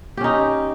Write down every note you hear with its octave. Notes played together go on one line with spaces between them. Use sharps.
C#4 D#4 G4